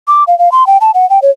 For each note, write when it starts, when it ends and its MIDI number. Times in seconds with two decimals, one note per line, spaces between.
0.08 0.24 86
0.27 0.37 77
0.39 0.52 77
0.52 0.66 84
0.67 0.78 79
0.81 0.91 81
0.94 1.08 78
1.10 1.19 79
1.22 1.30 73